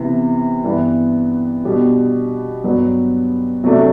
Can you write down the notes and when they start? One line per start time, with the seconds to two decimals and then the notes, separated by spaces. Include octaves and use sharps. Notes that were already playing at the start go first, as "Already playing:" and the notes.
Already playing: C3 E3 B3
0.64 G2 E3 B3
1.64 B2 G3 D4
2.64 G2 F#3 B3
3.64 C3 F#3 A3 D4